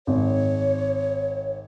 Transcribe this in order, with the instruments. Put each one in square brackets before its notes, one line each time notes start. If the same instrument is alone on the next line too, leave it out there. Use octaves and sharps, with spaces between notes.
[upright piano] G#1 [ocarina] C#5